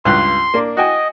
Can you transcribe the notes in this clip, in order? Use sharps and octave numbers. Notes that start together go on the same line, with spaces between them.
C#2 G2 C6 F#6
A#3 D4
F#4 D#5 G5 G#5